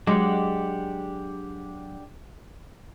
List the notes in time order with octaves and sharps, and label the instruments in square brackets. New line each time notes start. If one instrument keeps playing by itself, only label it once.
[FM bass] F#3 [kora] G#3 [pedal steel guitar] D4 G4 F#5